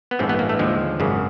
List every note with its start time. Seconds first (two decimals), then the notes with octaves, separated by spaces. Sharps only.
0.11 B3
0.19 A1 G2 E3 G#3 C4
0.29 B3
0.39 A#3
0.49 A3
0.59 D#2 D3 F3 G#3
1.00 G#1 F#2 C#3